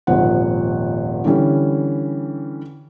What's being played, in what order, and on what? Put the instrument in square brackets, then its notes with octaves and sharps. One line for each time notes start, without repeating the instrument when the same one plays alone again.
[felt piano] D#1 G#1 F3 F#5
D3 E3 G3 C#4